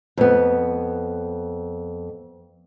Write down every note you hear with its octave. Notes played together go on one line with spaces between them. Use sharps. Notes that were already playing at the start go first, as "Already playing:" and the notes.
F2 B3